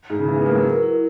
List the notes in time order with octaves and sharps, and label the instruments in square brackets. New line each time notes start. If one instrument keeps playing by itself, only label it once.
[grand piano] G#2 [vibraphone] G#4
[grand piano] C#3
[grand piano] E3 [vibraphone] G#4
[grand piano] B3
[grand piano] A#3 [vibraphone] B4
[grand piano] F#3
[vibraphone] A#4
E4